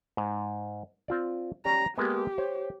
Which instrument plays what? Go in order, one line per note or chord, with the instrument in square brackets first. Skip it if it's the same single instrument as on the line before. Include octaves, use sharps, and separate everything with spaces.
[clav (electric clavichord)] G#2
C4 F4 D5
[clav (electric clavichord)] C#4 G4 D5 [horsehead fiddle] A#5
[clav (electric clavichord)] G#3 A#3 B3 [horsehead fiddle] G4
[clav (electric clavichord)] C5 C#5